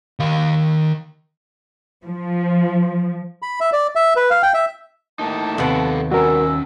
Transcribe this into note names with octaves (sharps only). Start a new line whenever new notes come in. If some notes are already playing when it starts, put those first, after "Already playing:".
D#3 F5
F3
B5
E5
D5
E5
B4
F5
G5
E5
A2 A#3 D#4 A5
D#2 C3 B3 A4 F5 F#5
G3 C#4 F#4 A#4 E6